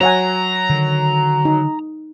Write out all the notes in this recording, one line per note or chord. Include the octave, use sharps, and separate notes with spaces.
F#3 C#5 F#5 G#5 A#5
D3 D#3
D#4